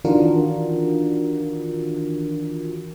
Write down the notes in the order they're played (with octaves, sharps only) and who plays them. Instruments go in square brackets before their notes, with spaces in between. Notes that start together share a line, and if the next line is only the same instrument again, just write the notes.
[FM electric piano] D#3 E3 D4 F4 F#4 A#4